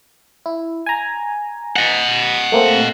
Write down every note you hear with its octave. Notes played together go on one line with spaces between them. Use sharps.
E4
G#5 A#5
D#5 F#5
A3 A#3 C4